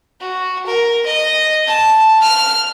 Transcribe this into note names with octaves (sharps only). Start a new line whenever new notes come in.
F#4
A#4
D#5
A5
F6